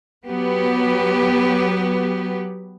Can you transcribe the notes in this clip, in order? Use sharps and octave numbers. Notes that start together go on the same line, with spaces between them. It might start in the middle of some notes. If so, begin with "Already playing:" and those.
F#3 B3 G4 B4